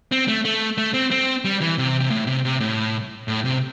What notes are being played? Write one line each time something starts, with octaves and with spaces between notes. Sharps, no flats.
C4
A3
A3
A3
C4
C4
G3
E3
C3
C3
A2
C3
C3
A2
A2
C3